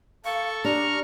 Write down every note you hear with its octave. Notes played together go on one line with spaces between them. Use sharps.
A4 F5 C#6
D4 G4 A#5 C#6 F6